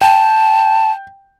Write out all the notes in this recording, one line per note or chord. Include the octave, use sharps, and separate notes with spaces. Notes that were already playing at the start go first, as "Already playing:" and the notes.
G5 A5